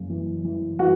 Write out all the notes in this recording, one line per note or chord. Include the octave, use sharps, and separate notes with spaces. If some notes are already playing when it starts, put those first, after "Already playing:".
Already playing: F#1 C#3
E3
E3
E3 F#4